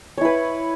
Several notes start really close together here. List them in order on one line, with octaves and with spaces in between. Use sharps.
C#5 E4 B4